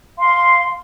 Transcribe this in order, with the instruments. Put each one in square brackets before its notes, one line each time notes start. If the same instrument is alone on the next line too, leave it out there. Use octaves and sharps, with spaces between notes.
[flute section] F5 C6